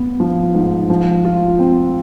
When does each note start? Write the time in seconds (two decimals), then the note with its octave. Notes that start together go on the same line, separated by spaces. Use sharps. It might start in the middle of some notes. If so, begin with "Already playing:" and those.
Already playing: B3
0.20 F3
0.54 G#2
0.90 F3
1.25 F4
1.59 C4